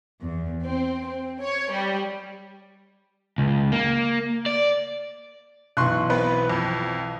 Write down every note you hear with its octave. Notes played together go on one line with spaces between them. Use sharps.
E2
C4
C4
C#5
G3
C#2
A#3
D5
B1 E3 C6 C#6 F#6
B3 C4 B4
F2